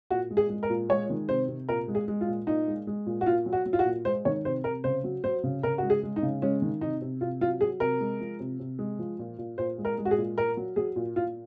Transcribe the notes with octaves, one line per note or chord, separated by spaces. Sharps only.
A#2 F#4
G#3
G#4
G#3
A#4
A#2
G#3 C#5
D#3
C3 C5
C3
A#2 A#4
G#3
G#4
G#3
F4
A#2
A#2 D#4
G#3
G#3
A#2
F#4
A#2 F4
F#3
F#4
F#3
F4
F#4
A#2
G#3 C5
D#3 C#5
C3 C5
C3 A#4
C#3 C5
F#3
F#3 C5
C#3
C#3 A#4
G#3 F#4
G#4
G#3
D#4
C#3
G#3 C#4
D#3
C3 D#4
C3
C3 F4
F#3 F4
F#3 G#4
C3 A#4
G#3
F3
C3
C3
G#3
F3
A#2
A#2
A#2 C5
G#3
A#4
G#3
F#4
G#4
A#2
A#2 A#4
F#3
F#3 G#4
A#2
A#2 F4